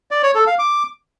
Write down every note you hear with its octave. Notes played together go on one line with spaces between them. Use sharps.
D5
C#5
A4
F5
D6